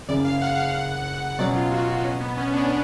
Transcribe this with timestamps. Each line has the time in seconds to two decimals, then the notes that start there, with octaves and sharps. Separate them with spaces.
0.09 F#1 F#2 C#3 D5
0.25 F5
0.42 F#5
0.74 F#5
1.39 B2 F#3 C#4 D5
1.56 F4
1.72 F#4
2.04 C#4
2.21 B3
2.37 C#4
2.53 D4